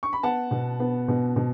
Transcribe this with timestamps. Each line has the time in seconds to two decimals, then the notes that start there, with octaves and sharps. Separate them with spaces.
0.03 C#6
0.13 B5
0.23 B3 F#5 A5
0.51 B2
0.80 B3
1.08 B2
1.36 B2